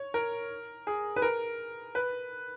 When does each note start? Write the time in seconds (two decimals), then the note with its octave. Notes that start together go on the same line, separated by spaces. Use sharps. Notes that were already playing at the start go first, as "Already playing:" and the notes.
Already playing: C#5
0.14 A#4
0.87 G#4
1.16 B4
1.22 A#4
1.95 B4